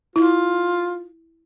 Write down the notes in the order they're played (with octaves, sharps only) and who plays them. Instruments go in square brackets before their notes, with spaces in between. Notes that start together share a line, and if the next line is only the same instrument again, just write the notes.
[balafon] E4 [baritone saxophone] F4